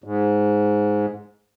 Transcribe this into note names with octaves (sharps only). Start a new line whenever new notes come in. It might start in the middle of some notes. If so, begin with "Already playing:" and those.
G#2